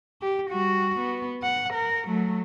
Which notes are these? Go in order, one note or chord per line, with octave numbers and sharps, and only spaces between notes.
G4
G3 F#4
B3
F#5
A#4
F#3 A3